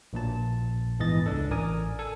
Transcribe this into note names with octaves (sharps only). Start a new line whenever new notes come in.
A#1 A#2 A5
E2 G#2 E3 D#5 A6
C#2 D4 A4
A1 A#4 D5 G#5 D#6
A4 G#5